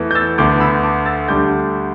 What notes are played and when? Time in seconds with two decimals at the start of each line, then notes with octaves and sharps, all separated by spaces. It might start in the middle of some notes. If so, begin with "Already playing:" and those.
Already playing: E2 E3 A3
0.11 G6
0.15 E6 A6
0.38 D2 D3 B3 D4 D6 G6
0.60 B5 E6
0.83 A5 D6
1.06 E6 A6
1.28 D2 D3 G3 D4 D6 G6